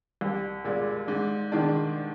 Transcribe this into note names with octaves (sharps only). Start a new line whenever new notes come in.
C2
A#2 G#3
G#2
D#3 G#3 D4